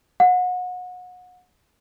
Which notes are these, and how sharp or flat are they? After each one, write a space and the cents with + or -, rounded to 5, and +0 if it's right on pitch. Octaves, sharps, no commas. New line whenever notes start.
F#5 -30